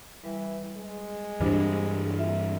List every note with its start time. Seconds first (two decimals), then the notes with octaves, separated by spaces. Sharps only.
0.24 E3 G3 B4
0.77 G#3
1.40 G2 E3 G3 D4 C5
2.17 F4 G#4 E5